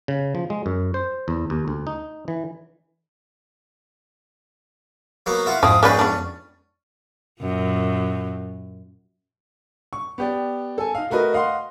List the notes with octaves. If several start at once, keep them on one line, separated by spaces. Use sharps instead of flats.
C#3
F3
G#3
F#2
C5
E2
D#2
D2
D#4
E3
F#3 A#3 B3
E4 F4 F#5
F2 G#2 F3 C4 D#6
A#3 C#4 F#4 G#4 B4 D5 G5
B3 C#4 D4
F#2 A#2
C#6
B3 G4 D5
A4 G#5
D#4 F5
A3 F#4 A#4 B4 D#5
D#5 F5 F#5 C6